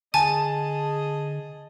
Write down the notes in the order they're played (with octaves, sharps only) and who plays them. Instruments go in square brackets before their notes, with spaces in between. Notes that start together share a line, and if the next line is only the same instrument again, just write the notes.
[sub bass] D3 [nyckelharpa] G#4 D#5 [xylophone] G#5 [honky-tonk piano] A5